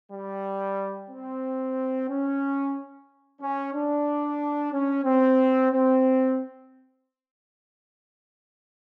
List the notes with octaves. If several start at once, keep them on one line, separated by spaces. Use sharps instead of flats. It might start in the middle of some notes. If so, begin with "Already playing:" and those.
G3
C4
C#4
C#4
D4
C#4
C4
C4